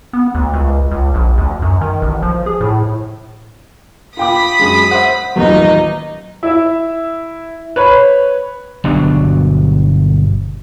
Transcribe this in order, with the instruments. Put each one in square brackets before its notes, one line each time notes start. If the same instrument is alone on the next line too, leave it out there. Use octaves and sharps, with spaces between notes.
[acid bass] B3
D2
C#2
C#2
A#1
D2
F#2
D#3
A1
F3
G#4
A2
[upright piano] F4 G5 D6 [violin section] B5 B6 [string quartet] D#6
[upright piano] F#2 G#3
[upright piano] C5 [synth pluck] E5 F#5
[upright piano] D#1 A1 D#2 [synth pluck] F#3 [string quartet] D#4 D#5
[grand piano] E4 E5
B4 C#5 B5
[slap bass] G1 B2 F#3 D4